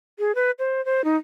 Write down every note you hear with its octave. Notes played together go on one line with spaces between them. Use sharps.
G#4
B4
C5
C5
D#4